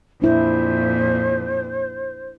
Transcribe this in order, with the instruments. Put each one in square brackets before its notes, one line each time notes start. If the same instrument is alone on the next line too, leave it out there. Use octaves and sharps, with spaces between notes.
[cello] F2 A#2 [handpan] D4 E4 [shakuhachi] C5